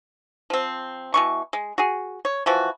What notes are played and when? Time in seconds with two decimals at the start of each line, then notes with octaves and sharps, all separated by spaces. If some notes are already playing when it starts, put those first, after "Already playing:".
0.50 F3 C4
1.14 B2 E3 C#6
1.53 G#3
1.78 F#4 G#4
2.25 C#5
2.46 E3 F3 F#4